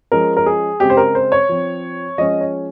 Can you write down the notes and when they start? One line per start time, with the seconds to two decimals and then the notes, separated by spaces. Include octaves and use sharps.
0.12 F3 G#3 C#4 A#4
0.37 A#4
0.46 G#4
0.80 C#3 G#3 C4 G4
0.90 C5
0.97 A#4
1.15 C5
1.32 C#5
1.49 F3 C4
2.18 F3 G#3 C#4 D#5
2.41 C#5